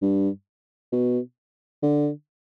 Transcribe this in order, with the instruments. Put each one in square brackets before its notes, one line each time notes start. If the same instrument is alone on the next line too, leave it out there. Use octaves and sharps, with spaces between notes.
[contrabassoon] G2
B2
D3